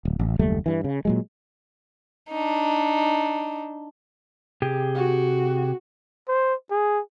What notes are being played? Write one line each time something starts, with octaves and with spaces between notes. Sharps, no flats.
D1
A1
F#1 D#2 G3 A3
G2 E3
C#3
A#2 F#3 G#3
D4 D#4
C3 G4 G#4
F#4
C5
G#4